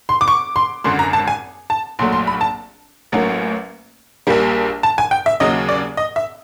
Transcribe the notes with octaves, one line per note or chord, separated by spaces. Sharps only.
C6
D6
C#6
C6
G#1 F#2 D3 C6
A#5
A5
G#5
A5
A#1 A#2 F#3 A3 C6
C6
B5
A5
A1 A2 F#3 A#3 C#4
A#1 A#2 G3 A#3
A5
G#5
G5
E5
D#2 C#3 F#3 D#5
D5
D#5
E5